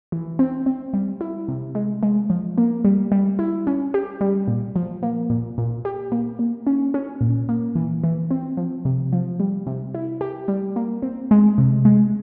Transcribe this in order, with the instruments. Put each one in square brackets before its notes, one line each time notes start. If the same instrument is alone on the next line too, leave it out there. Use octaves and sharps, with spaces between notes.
[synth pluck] E3
C4
C4
G3
E4
C3
G#3
G#3
F3
A#3
G3
G3
E4
C#4
G4
G3
A#2
F3
A#3
A#2
A#2
G4
A#3
A#3
C#4
C#4
A#2
A#3
E3
E3
C4
F3
C3
F3
G3
C3
E4
G4
G3
A#3
C4
G#3
C3
G#3